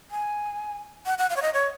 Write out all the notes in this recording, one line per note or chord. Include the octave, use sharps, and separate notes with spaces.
G#5
F#5
F#5
F5
C#5
D#5
C#5